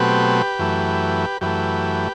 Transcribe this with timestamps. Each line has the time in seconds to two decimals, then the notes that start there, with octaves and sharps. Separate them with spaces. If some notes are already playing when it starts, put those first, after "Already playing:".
Already playing: B2 F#3 A3 C4 G4 B4
0.59 F#2 E3 A3
1.41 F#2 E3 A3 G4 B4